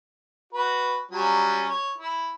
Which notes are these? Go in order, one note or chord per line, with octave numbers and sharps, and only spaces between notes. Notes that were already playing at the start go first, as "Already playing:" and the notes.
F#4 B4
F#3 G3 C#4
C#5
E4